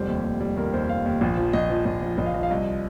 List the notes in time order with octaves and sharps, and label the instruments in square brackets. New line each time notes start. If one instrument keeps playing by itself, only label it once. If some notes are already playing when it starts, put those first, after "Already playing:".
Already playing: [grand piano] F1 G3 C5
D#2
D#2
G3
D#2 A#4
D#2 C5
D#2 F5
D#2
A#1
F3
A#1 D#5
F3
A#1
F3
A#1 D#5
F5
F3 D#5
F5
C2 D#5